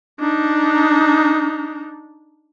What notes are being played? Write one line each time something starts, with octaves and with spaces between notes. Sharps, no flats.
D4 D#4